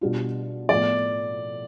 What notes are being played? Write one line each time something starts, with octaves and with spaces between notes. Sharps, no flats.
B2 G3 D4 F4
A2 F3 B3 F4 D5